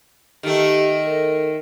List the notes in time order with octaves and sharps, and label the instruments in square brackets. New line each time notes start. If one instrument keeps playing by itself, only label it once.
[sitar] D#3 A3 [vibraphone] G4 D#5
[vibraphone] A4 A#4